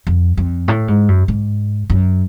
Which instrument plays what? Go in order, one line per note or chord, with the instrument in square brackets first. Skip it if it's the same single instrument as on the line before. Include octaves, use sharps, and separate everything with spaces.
[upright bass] F2
F2
A2
G#2
F#2
G#2
F#2